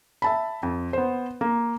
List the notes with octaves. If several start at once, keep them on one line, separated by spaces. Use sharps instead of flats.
E5 A5 B5
F2
B3 C5
A#3